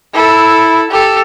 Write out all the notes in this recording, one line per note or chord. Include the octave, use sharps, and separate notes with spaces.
E4 A4
G4 A4